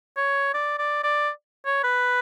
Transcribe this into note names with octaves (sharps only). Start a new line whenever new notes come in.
C#5
D5
D5
D5
C#5
B4